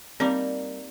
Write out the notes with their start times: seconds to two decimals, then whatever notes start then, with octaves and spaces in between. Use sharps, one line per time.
0.20 G3 A#3 C4 D#4 A#4